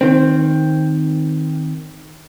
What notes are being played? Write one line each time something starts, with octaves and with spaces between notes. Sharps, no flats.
D#3 C4